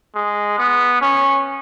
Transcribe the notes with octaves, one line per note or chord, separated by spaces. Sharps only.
G#3
B3
C#4